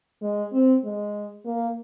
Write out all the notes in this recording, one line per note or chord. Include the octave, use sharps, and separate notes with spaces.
G#3
C4
G#3
A#3